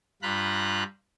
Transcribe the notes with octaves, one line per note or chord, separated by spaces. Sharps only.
G2 F4 A#5 B5 F#6